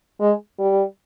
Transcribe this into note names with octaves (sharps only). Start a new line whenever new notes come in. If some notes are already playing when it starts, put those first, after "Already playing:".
G#3
G3